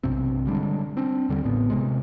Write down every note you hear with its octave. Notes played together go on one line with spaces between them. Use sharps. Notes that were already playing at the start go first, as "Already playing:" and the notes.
B1 G2 C3 C4
D3 G3 G#3 D4
C4 D4
D#2 D3 G3
A1 A2 B3
C3 G#3